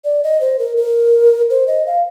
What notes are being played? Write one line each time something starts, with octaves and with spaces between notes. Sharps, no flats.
D5
D#5
C5
A#4
A#4
C5
D#5
F5